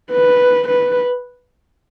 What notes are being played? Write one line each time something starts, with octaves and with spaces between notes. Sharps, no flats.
B4
B4